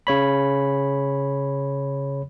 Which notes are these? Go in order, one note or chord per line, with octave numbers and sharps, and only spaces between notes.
C#3 C#5 B5